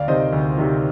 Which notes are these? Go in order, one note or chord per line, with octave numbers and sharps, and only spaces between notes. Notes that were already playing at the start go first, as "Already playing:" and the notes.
Already playing: D2 D5 F5
C3 D#3 C5 D#5
D2
C3 D#3